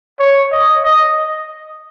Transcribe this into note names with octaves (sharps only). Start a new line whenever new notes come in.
C#5
D#5
D#5